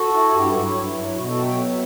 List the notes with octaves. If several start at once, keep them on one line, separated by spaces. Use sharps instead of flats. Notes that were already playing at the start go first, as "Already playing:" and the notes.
Already playing: F#4 A4
E4
G2 E4 G4
F#4
F#3
E4
G2
F#3
B2 F#4
F#4 A4
F#3
E5 G5
B3